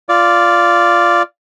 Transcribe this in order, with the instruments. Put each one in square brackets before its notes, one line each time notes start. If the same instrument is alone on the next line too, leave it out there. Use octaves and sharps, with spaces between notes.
[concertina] F4 D5